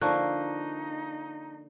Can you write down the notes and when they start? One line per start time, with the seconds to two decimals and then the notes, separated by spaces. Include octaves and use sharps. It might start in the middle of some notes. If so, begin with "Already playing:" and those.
0.01 D3 F3 A#3 D#4 A5 C#6 F#6